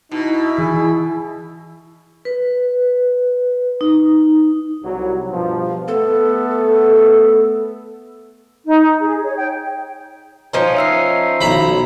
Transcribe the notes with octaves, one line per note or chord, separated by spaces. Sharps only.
B2 D#4 E4
E3 G#4
B4
D#4
C2 F#3
G2 B2 F3
A3 B3 A4
D#4
G#4
C#5
G5
F3 C#4 D#4
E5 E6 C7
B1 A#5 B5